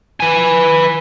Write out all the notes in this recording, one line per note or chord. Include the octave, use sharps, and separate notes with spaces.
B4 G#5